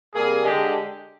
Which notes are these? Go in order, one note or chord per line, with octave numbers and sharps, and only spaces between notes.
C3 G3 A#3 G#4
D3 G#3 G4